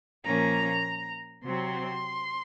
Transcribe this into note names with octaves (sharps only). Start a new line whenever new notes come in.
A#2 F3 A#3 C#4 A#5
C3 F#3 C4 C6